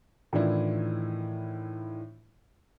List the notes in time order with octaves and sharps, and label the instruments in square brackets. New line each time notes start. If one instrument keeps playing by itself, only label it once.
[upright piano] A2 D#3 E3 D4 E4 F4